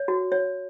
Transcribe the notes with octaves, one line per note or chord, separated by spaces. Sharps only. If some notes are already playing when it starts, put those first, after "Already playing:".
Already playing: C#5
F#4
C#5